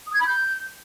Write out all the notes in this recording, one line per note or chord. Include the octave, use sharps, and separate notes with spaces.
D#6
G#6
B5
G6